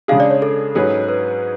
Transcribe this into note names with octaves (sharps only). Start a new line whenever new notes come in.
C#3 G#3 D4 G#4 F5
D5
C#5
A4
G#2 F#3 C#4 G#4 B4
B4